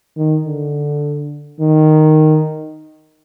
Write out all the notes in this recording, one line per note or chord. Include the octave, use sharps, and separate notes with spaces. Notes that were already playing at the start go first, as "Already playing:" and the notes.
D#3
D3
D#3